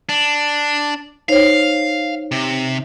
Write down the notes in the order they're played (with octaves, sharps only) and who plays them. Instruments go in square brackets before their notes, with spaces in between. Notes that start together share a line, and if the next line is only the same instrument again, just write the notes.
[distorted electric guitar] D4
[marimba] D#4 C5 C#5 [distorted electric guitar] F5
[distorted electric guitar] C3